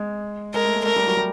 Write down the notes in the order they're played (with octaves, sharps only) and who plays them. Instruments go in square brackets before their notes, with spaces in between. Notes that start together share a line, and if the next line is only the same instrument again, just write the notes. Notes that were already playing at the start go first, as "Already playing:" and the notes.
Already playing: [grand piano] G#3
[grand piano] G#3 [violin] A#4
[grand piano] A3
A#3
[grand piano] A3 [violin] A#4
[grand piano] G3
F#3
G3